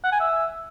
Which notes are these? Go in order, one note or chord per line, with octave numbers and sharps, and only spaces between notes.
F#5
G#5
E5